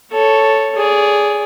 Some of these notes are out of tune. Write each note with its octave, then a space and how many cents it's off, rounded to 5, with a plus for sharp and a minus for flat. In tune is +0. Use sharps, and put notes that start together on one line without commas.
A4 +0 C#5 +0
G#4 +0 D5 -30